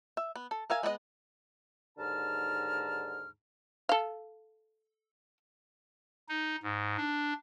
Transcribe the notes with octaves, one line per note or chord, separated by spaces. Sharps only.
E5
B3
A4
A#4 E5 F5 G#5
G#3 B3 A4 D#5
D#2 G#2 D3 A5 A#5 F6
A4 F5
D#4
G#2
D4